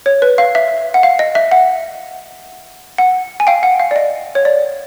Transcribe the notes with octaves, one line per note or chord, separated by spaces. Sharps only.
C#5
B4
F5
E5
F#5
F5
D#5
E5
F#5
F#5
G#5
F5 G5
F#5
F5
D5
D#5
C#5
D5